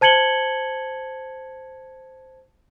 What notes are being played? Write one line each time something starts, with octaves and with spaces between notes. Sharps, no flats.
C5 A5 G#6 C#7 F#7 G7